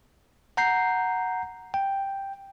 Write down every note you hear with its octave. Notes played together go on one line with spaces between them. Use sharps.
F#5 A#5 G6 C7
G5